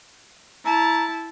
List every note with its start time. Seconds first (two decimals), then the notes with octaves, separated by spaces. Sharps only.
0.65 E4 A5 A#5